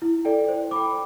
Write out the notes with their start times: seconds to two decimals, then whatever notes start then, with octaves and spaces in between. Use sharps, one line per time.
0.02 E4
0.25 A4 D5 G5
0.48 C5
0.71 G5 B5 D6